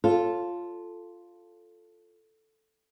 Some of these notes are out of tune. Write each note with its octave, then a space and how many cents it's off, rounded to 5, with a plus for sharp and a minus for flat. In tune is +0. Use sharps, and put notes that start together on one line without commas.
F4 +0 A4 +0 C#5 -20